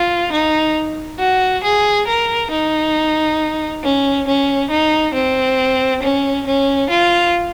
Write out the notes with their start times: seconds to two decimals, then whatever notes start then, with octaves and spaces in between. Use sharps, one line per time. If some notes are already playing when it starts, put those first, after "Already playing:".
Already playing: F4
0.32 D#4
1.19 F#4
1.63 G#4
2.07 A#4
2.51 D#4
3.83 C#4
4.27 C#4
4.70 D#4
5.14 C4
6.02 C#4
6.46 C#4
6.90 F4